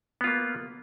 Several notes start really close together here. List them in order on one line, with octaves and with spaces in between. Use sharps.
B3 F4 A#3